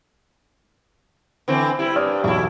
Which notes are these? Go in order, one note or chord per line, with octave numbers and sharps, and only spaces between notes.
D3 E3 C4
G3 E4
G2 D5 D#6 F6
B1 E2 B2 A3 E4